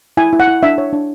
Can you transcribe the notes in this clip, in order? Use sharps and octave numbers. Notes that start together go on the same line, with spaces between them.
E4 G#5
E4
F#5
E4
D4 E5
C#5
D4